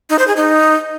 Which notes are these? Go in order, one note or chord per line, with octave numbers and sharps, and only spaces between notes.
D#4
C5
G#4
D#4